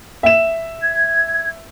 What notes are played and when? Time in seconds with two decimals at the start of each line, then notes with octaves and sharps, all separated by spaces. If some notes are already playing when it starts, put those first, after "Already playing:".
0.23 E5 E7
0.82 G#6